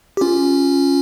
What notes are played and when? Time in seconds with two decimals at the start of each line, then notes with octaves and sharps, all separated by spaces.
0.17 G4
0.21 C#4 F4